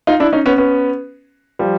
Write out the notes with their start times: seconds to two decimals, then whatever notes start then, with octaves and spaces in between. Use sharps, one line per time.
0.07 D#4 F4
0.20 D4 E4
0.33 C#4 D#4
0.46 B3 C#4
0.58 B3 C#4
1.59 F3 G3